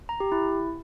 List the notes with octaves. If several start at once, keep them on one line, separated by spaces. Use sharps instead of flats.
A#5
G4
E4